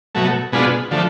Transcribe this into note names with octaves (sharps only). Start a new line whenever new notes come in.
B2 F#3 A3
B2 G#3 B3 D4 F4
D3 F3 A3